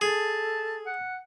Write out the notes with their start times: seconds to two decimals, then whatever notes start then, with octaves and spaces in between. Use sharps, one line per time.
0.01 G#4 A4 A5
0.86 F#5